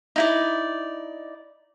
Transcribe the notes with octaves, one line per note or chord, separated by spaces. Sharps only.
D#4 E4 D5